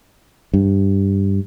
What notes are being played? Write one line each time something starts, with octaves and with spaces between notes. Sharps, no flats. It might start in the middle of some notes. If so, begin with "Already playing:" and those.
G2